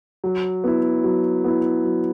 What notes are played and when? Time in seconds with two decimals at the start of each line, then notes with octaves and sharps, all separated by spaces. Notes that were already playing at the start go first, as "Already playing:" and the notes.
0.24 F#3
0.64 B3 E4
1.04 F#3
1.44 B3 E4
1.84 F#3